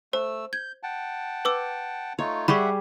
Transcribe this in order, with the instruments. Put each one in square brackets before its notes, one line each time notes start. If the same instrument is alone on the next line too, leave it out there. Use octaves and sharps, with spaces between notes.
[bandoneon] A3 E6 [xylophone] C5
[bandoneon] G6 [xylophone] G#6
[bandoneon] F#5 G5 A5
[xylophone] B4 D6 E6
[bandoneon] A3 D#4 F4 [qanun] C#5
[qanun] G3 G4 G#4 [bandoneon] E5 F#5 [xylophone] B5 C#6